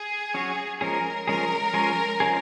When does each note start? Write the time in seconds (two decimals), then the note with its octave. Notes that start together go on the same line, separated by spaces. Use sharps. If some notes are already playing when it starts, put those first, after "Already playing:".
Already playing: G#4
0.34 F#3 C#4 F#4 C#5
0.81 F3 G#3 C#4 G#4 A#4
1.27 F3 G#3 C#4 G#4 A#4
1.74 F3 G#3 C#4 G#4
2.20 F3 G#3 C#4 G#4